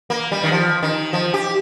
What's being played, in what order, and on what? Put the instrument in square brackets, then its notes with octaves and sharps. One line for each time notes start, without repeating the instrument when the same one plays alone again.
[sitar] A#3
G3
D#3
F3
D#3
F3
G4